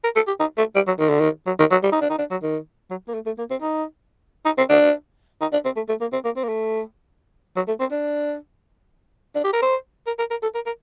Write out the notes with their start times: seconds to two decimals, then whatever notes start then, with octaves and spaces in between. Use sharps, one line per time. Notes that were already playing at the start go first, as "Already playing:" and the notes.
0.04 A#4
0.16 A4
0.28 G4
0.40 D#4
0.58 A3
0.76 G3
0.88 F#3
1.00 D#3
1.10 D3
1.20 D#3
1.47 F#3
1.59 D#3
1.72 F#3
1.83 G3
1.92 D#4
2.01 D4
2.10 D#4
2.19 D4
2.31 F#3
2.43 D#3
2.91 F#3
3.09 A#3
3.14 A3
3.26 A3
3.39 A#3
3.51 C4
3.62 D#4
4.46 D#4
4.58 C4
4.70 D4
5.41 D#4
5.53 D4
5.65 C4
5.77 A3
5.89 A3
6.01 A#3
6.13 C4
6.25 A#3
6.37 C4
6.44 A#3
6.49 A3
7.57 F#3
7.68 A3
7.80 C4
7.92 D4
9.35 D4
9.44 G4
9.53 A#4
9.62 C5
10.07 A#4
10.19 A#4
10.31 A#4
10.43 A4
10.55 A#4
10.67 A#4